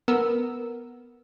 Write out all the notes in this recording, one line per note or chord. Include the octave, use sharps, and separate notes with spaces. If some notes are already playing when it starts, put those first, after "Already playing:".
B3 A#4 E6